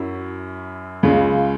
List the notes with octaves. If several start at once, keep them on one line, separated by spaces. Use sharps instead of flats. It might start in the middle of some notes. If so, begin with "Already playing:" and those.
Already playing: F#2 F#3 C#4 E4
C#2 C#3 G#3